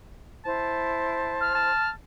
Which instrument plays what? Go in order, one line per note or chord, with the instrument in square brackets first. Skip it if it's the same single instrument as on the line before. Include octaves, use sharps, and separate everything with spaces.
[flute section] E4 C5 [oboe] A5
[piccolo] F6
[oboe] A5